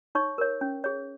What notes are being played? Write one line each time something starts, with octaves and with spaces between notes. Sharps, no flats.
D#4 C#5 C#6
A#4 C#5
C#4
G#4 C#5